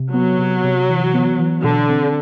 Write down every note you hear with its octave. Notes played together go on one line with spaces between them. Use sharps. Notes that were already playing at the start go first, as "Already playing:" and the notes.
Already playing: C3
F#3 B3
C3
C3
E3
B3
E3
B2 D3
C4